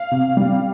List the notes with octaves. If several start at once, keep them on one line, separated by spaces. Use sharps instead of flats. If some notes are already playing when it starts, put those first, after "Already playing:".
Already playing: F5
C3
G3